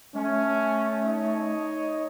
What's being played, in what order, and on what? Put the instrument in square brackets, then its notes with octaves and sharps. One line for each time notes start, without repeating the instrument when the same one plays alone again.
[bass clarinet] A3 [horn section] C#4
[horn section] D#4 C#5 D#5